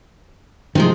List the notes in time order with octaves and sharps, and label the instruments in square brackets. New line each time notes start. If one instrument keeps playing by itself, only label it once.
[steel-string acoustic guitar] C3 F3 G#3 [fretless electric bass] D#3